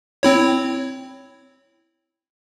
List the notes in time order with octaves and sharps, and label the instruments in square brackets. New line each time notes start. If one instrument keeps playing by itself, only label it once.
[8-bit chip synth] C4 E4 C#5